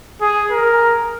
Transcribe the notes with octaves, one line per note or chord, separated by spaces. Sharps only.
G#4
A#4